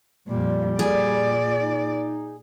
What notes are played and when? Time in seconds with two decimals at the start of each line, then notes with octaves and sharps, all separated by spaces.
0.28 F2 A#2 G3
0.79 A#2 G#4 D5
1.60 D#4